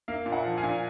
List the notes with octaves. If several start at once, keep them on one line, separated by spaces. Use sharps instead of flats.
A#3 F5
A#2
F#5
F3
F5 G#5
A#2